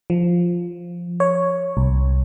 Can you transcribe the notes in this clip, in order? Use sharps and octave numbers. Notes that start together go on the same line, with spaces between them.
F3
C#5
C2